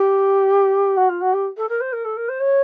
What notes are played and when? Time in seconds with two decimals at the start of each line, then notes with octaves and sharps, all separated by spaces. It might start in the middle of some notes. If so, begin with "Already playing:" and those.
Already playing: G4
0.96 F#4
1.09 F4
1.21 F#4
1.33 G4
1.57 A4
1.69 A#4
1.80 C5
1.92 A#4
2.04 A4
2.16 A#4
2.28 C5
2.40 C#5